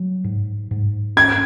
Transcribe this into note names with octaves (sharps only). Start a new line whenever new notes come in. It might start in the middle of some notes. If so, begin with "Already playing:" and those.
Already playing: F#3
G#2
G#2
C#4 G#6